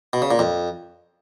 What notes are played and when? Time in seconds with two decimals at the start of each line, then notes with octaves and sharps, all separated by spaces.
0.13 B2
0.22 C#3
0.31 A#2
0.39 F2